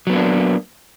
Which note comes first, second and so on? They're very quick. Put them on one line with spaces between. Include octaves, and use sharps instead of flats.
F#3 B3 A#3 D4